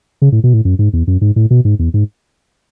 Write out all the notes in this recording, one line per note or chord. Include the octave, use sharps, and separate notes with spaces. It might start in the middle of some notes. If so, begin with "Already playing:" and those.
C#3
A2
B2
A2
F#2
G#2
E2
F#2
G#2
A2
B2
G#2
E2
G#2